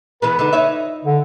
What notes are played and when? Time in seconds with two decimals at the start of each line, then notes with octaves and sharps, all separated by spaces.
0.22 E3 G#3 B3 B4
0.39 D3 D#4
0.53 D#4 C#5 E5
1.05 D3